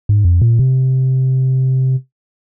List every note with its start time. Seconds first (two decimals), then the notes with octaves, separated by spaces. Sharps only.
0.09 G#2
0.25 F2
0.42 A#2
0.59 C3